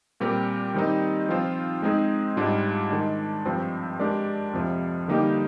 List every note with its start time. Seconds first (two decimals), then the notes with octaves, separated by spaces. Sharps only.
0.20 A#2 G3 C4 G4 A#4
0.74 D#3 G3 C4 D#4
1.29 F3 C4 F4 C5
1.82 G#3 C4 D#4 G#4
2.36 G#2 G3 D4 F4
2.91 D#3 G#3 D4
3.45 G2 F3 C4
3.99 G#3 D4 G4 A#4 D5
4.53 F2 C3 F3
5.08 D3 G3 A#3 D#4 G4